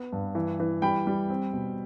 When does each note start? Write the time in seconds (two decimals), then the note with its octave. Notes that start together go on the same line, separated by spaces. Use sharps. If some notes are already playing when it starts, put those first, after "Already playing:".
Already playing: B3
0.13 G2
0.35 E3
0.60 E3
0.82 G3 G5 B5
1.07 G3
1.30 C4
1.53 B2